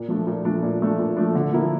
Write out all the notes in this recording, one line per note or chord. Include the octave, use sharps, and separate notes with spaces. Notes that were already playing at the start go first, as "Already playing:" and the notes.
Already playing: A#2
F3 A3 D4
A#2
F3 A3 D4
A#2
F3 A3 D4
A#2
F3 A3 D4
D3
F3 A#3 E4